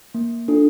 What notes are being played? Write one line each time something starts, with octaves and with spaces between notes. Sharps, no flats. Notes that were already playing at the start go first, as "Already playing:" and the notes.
A#3
D4 F4 A4